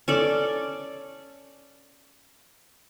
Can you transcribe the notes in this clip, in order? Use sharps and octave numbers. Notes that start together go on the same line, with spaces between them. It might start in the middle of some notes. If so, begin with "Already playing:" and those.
C#4 A4 D5